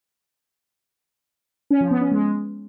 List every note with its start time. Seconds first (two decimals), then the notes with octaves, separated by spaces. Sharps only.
1.71 C#4
1.81 F3
1.91 B3
2.01 C#4
2.11 G#3